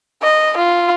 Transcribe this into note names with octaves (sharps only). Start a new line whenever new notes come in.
D#5
F4